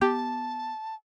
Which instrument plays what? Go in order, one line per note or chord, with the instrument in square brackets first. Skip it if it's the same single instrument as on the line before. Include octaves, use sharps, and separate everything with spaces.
[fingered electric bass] B3 [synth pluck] G4 [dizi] A5